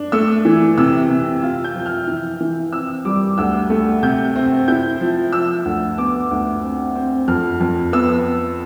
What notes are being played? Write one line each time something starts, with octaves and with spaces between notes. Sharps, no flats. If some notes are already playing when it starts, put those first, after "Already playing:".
Already playing: D4
A3 E6
E3
C3 E6
C3
F4
G6
F3
F6
E3
E3
C4 E6
G3 D6
D2 E6
A3
C3 G6
C4
E4 G6
F3
F3 E6
D2
B3 D6
D2
C4
C4
F2 F6
F2
B3 E6